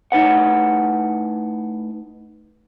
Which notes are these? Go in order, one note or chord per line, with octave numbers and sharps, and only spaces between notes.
A2 D#4 B4 F#5